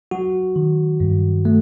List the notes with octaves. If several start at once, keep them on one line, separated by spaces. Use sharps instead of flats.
F#3 F#4
D#3
G2
A3